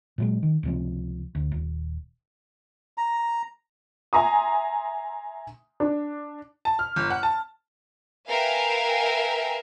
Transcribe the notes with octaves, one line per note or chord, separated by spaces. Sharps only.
A#2 F#3 G#3
D#3
C#2 C3 F3
D2
D#1
A#5
E5 G#5 A#5 C6 D#6
D4
A5
F6
G1
F#5
A5
A#4 B4 E5 F5 G5 G#5